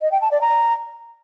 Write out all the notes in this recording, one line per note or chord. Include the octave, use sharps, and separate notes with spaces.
D#5
G5
A5
D5
A#5